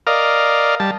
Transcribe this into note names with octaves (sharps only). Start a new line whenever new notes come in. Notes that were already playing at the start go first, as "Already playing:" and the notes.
A#4 D5 D#5 F5
G3 A5